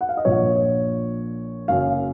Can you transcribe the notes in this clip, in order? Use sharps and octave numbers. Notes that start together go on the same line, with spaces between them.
F#5
F5
D#5
A#1 A#2 F3 C#5
F#1 F#2 C#3 F5